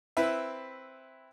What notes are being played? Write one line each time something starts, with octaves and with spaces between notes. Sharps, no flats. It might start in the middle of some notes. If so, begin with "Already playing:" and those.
C4 E4 B4 E5